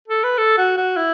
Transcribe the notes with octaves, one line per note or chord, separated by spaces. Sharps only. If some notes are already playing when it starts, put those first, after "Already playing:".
A4
B4
A4
F#4
F#4
E4